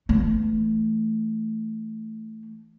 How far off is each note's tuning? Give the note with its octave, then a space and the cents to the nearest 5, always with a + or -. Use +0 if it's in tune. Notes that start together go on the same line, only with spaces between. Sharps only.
E3 +0 A3 +0